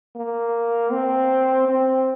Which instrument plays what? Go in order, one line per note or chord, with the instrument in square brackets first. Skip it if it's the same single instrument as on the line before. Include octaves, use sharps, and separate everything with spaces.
[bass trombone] A#3
C4
C4